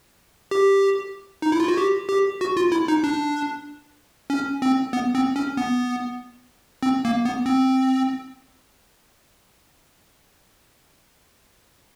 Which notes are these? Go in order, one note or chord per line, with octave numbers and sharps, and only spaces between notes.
G4
D#4
E4
F4
F#4
G4
G4
F#4
F4
E4
D#4
D4
C#4
C4
B3
C4
C#4
B3
C4
A#3
B3
C4